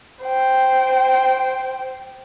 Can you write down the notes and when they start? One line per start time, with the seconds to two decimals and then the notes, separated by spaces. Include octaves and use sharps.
0.24 C5 G5